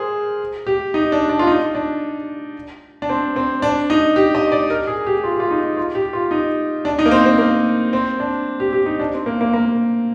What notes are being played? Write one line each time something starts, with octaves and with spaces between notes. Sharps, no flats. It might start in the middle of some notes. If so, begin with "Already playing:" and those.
Already playing: G#4 A#4 C5
G4
D#4
D4
D4
F4
D#4
D4
D4
C4
C4
D4
D#4
G4
D#5
D5
A#4
G#4
G4
F4
G4
F4
D#4
F4
G4
F4
D#4
D4
D#4
A#3
C4
C4
A#3
C4
D4
G4
G4
D#4
D4
C4
A#3
A#3
A#3